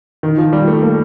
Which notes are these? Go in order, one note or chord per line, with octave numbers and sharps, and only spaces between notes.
D#3
F3
G3
A3
A#3